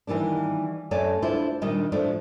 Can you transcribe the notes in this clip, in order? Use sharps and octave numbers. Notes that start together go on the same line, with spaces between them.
D#3 E3 G3 A#3 D4
F#2 A3 C#5 D5 G#5 A5
D4 E4 F4 C5
A#2 D#3 G3 D4 D#4 D#5
A2 F3 A3 D4